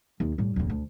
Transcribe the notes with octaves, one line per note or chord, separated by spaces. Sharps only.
D#2
A2 G3
D1 E2
D2